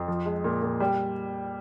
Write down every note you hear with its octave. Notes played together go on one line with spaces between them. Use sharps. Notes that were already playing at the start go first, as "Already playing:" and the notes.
Already playing: F2
F3
G#3
A#2
A#2
G3